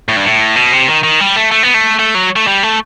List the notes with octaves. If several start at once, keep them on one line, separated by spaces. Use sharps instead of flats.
A2
G2
A2
B2
C3
D#3
D#3
G3
A3
A3
B3
A3
A3
F#3
A3
G3
A3